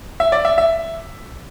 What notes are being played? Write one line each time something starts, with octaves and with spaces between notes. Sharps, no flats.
E5
D5
E5
E5